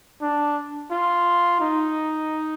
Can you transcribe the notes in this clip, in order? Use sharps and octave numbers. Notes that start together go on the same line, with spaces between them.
D4
F4
D#4